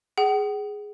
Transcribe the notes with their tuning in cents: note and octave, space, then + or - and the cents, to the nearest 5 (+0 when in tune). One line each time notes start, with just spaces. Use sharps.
G#4 +0 F#5 +45